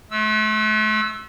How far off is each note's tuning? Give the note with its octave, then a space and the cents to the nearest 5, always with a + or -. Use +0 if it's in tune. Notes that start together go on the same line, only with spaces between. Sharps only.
A3 -40 E6 +0